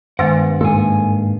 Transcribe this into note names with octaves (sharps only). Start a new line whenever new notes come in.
G2 D#3 G#3 B3 F#5
G#2 D#3 A#3 A4 G#5